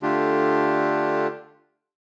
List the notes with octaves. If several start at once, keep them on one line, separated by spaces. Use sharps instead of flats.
D3 A3 D4 F4 G4